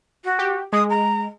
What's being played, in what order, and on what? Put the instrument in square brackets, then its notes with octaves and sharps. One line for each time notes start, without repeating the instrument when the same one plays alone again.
[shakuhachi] F#4
[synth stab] G4
[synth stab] G#3 [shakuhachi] D#6
[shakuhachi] A#5